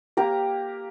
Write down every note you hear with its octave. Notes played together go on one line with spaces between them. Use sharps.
A#3 G4 A#5